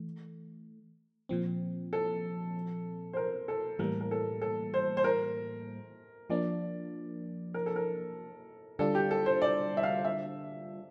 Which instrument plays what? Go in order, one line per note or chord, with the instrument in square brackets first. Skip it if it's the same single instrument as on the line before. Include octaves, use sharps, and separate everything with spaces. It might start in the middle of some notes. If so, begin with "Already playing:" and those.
Already playing: [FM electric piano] E3 A3
A#2 F3 C4
[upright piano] A4
C5
A#4
A4
[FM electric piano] A2 E3 G3 A#3 [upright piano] A#4
[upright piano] A#4
A4
A4
C5
C5
A#4
[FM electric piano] F3 A#3 D4 [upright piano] D5
[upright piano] A#4
A4
A#4
[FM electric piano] D3 G3 D4 F4 [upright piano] A4
[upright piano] G4
A4
C5
D5
E5
F5
E5